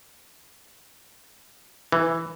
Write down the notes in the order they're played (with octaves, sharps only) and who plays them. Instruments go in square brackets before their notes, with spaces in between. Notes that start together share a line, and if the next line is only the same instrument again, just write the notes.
[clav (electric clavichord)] E3